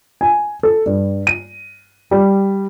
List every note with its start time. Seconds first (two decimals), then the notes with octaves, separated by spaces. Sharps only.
0.21 G#5
0.63 A4
0.86 G2
1.27 D#7
2.11 G3